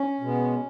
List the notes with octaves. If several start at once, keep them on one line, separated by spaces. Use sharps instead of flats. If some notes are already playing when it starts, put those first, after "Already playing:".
Already playing: C#4
B2 G#3 B3